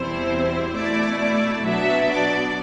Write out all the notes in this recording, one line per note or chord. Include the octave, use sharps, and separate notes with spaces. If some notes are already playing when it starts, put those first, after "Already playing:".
Already playing: E2 B2 G3 C4 E4 C5
B2 A3 E4 D5
D5
B2 F#3 B3 D4 E5
D5